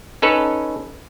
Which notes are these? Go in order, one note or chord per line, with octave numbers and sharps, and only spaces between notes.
C#4 D#4 A4 B4 C#5